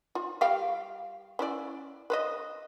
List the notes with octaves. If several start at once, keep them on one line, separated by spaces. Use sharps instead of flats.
F4
G3 F5 G5
C#4 E4 D5
B4 C5 D#5